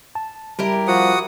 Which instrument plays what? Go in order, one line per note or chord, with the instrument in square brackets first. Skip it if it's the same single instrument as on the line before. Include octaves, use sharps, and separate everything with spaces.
[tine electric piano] A5
[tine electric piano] G3 [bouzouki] E4 G4 A#4
[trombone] F3 [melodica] F#4 F#5 D#6